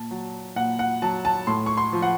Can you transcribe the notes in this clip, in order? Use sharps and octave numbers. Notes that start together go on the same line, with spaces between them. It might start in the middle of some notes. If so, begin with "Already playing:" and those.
Already playing: A#2 A5
F#3
A#2 F#5
F#5
F#3 A5
A5
A2 C6
C#6
C6
F3
F#5